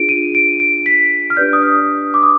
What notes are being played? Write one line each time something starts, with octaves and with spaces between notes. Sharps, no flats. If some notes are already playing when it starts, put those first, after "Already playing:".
Already playing: D4 F4 G#4 D7
D#7
D7
D7
B6
F6
D4 G4 B4 D5 G6
D#6
F6
D6
D#6